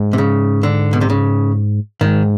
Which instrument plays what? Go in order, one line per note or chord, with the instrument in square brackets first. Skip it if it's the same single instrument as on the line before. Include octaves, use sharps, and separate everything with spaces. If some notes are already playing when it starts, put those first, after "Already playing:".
Already playing: [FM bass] G#2
[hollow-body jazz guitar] C3
C#3
D3
B2
C3
C#3
[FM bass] G#2 [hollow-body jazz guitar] D#3